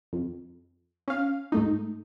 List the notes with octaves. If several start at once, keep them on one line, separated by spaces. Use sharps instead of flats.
F2
C#4 F5
G#2 A3 D#4